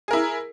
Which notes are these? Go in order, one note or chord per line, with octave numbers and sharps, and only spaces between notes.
E4 G#4 A#4